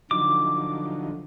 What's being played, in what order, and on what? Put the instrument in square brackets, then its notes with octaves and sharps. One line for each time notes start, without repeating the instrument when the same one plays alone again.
[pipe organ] D3 [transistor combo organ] F3 F#3 D#4 [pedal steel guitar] D6